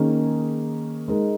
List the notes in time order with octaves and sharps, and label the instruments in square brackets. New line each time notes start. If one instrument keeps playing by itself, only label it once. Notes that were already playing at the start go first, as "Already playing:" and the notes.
Already playing: [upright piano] D#3 A#3 C#4 G#4
G#3 D#4 A#4